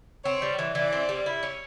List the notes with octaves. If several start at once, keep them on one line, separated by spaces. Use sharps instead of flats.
C4 C#5
G3
E3
E3 D5
C4
G3
E4
C#4